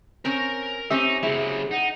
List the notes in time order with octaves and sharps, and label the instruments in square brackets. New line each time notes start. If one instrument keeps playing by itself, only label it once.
[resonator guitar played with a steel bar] C4 C#4 [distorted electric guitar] A#4 A#5
[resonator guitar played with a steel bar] C4 C#4 G4 [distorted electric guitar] D#4 [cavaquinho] E5
[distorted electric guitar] C#3 F#3 [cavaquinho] E4 [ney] G#4
[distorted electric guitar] D#4 [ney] F#5